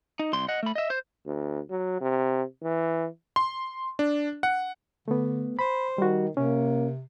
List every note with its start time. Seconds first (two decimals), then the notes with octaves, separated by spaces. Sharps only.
0.19 D#4
0.33 C2 C6
0.48 D#5 F#5
0.63 A3 B5
0.75 D#5 E5
0.90 C5
1.26 D2
1.70 F#3
2.01 C3
2.63 E3
3.36 C6
3.99 D4
4.43 F#5
5.08 D3 A3 B3
5.59 C5 B5
5.98 D#3 G3 F#4
6.37 C3 A#3 C#4